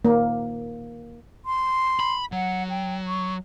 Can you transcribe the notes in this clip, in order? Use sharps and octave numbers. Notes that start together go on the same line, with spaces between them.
A#3
C6
B5
F#3 F#5
G5
C#6